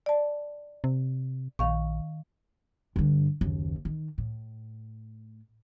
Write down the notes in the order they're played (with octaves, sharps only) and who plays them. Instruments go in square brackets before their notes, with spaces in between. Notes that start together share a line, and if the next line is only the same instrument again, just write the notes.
[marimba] D5 A5
[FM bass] C3
[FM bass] A#1 [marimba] D#3 F5 C#6
[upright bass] G2 D3
F#1 D#2
D#3
A2